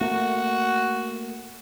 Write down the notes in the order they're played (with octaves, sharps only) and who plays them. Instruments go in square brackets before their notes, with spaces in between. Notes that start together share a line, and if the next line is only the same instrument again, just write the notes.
[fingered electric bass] A3 A#3 [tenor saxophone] F#4